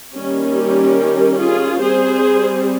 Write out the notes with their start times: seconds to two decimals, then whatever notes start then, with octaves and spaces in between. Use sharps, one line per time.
0.15 D#3 G3 A#3 C#4
0.57 G4 A#4
1.40 F4 G#4
1.81 G3 C4 G#4 C5